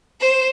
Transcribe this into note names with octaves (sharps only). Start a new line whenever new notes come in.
C5